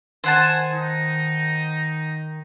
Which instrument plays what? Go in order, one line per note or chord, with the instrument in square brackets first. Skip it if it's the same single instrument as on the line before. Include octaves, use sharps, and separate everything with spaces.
[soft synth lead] D#3 [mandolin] C5 F#5 A5 [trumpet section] G#5
[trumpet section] D#4